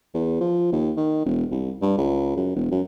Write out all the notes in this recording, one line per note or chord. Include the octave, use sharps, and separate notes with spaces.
E2
F3
D#2
D#3
E1
C2
G2
C#2
F#2
E1
F#2